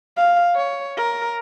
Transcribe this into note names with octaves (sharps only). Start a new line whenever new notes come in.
F5
C#5
A#4